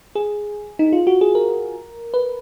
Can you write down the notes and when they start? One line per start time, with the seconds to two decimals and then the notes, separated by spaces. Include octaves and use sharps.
0.15 G#4
0.79 D#4
0.93 F4
1.07 F#4
1.21 G#4
1.35 A#4
2.14 B4